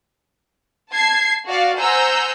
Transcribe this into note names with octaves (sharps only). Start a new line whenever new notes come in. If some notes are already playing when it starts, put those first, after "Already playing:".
A5 G#6 C7
F#4 D5 F5
C5 F#5 G#5 A#5 E6 G6